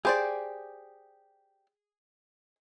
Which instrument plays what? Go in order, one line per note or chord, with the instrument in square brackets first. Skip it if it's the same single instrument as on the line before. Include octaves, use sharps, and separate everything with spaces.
[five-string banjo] G4 C5 D5 [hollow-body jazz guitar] G#4